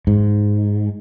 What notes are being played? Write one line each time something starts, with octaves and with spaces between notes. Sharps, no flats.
G#2